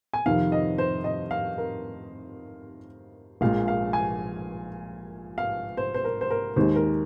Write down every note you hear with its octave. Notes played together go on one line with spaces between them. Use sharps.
G#5
F2 C3 D#3 F5
D#5
C5
D#5
F5
A#4
A#1 A#2 G#3 F5
F5
G#5
F5
C5
C5
A#4
C5
A#4
D#2 D#3 G#3 C5
A#4